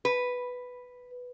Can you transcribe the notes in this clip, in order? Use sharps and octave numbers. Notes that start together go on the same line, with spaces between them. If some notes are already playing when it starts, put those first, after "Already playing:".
B4